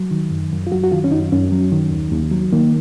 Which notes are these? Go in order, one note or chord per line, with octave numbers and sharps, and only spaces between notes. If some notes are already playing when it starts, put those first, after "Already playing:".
Already playing: F#3
D#3
F#2
F#2
F4
F#3 F#4
F#4
D#3 F4
C#4
F#2 D#4
F#2 C#4
F#3
D#3
D#2
D#2
F#3
D#3 A#3